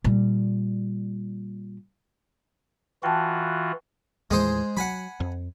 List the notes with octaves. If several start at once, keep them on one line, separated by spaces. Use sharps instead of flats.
A#2 G3
E3 F4 F#4 G5 A5
D#2 A2 E3 G#3 G#4 C5
F#3 F#5 G#5 B5
F2